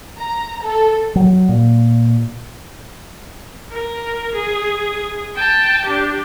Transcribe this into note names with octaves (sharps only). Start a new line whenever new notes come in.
A#5
A4
F#3
A#2
A#4
G#4
G5 A5
D4 G4